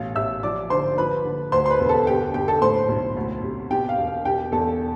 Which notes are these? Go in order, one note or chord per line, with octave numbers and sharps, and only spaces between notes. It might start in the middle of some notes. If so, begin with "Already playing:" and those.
Already playing: A1 B2 F5
A1 E5 E6
F3 D5 D6
D3 C5 C6
F3 B4 B5
D3
D2 C5 C6
C6
B4 B5
E1
A4 A5
G1 G4 G5
G1 G4 G5
A4 A5
A2 C5 C6
B1
D2
C3
B2 G4 G5
F5
E1
F5
B2 G4 G5
E2 A4 A5